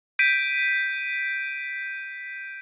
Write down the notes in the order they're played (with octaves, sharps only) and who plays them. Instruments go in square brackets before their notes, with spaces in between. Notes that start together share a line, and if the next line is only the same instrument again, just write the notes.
[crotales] G6 B6 D7 D#7